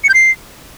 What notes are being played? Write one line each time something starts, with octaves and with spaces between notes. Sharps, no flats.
C#7
G6
C7